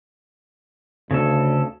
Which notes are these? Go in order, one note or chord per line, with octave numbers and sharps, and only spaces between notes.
D2 C#3 A4